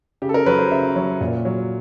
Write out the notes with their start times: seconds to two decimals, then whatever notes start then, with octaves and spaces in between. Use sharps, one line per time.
0.22 C#3 G4
0.29 A4
0.34 A#4
0.46 F#3 B4
0.59 C5
0.71 C#3 E5
0.96 F#3
1.21 A#2
1.45 F#3